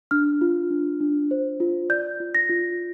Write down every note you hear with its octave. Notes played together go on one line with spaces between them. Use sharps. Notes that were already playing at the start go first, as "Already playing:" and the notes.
D4 F6
F4
D4
D4
C5
F4
D5 G6
F4
A#6
F4